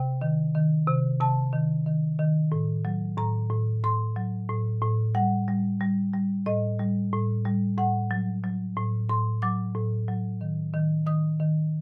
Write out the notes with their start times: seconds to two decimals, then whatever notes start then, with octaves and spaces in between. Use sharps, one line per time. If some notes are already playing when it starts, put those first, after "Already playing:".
Already playing: C3 G5
0.21 D#3
0.55 D#3
0.87 C3
1.20 C3 A5
1.53 D#3
1.86 D#3
2.19 D#3
2.52 A2
2.85 F#3
3.18 A2 A#5
3.50 A2
3.83 A2 C6
4.16 F#3
4.49 A2
4.82 A2
5.15 G3 F#5
5.48 G3
5.81 G3
6.14 G3
6.46 A2 D#5
6.79 G3
7.13 A2
7.45 G3
7.78 A2 F#5
8.11 F#3
8.44 F#3
8.76 A2
9.09 A2 C6
9.42 F#3 D6
9.75 A2
10.08 F#3
10.41 D#3
10.74 D#3
11.06 D#3 D#6
11.40 D#3